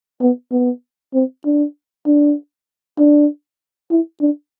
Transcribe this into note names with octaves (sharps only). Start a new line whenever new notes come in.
B3
B3
C4
D4
D4
D4
E4
D4